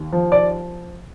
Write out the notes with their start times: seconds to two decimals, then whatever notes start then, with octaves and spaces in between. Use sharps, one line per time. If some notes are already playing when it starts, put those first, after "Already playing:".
Already playing: D#2
0.12 F3
0.32 D5